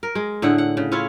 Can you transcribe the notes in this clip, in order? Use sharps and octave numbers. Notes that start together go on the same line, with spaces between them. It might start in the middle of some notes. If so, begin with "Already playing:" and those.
A#4
G#3
A2 D3 G#4 F#5
F#5
C#3
C#4 E4 F4 C#5